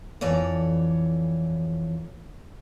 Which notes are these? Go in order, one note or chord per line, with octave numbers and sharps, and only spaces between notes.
F2 E3 C#5 D5